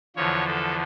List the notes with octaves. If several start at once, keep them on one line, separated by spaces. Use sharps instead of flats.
E2 D3 F3 C#5
A4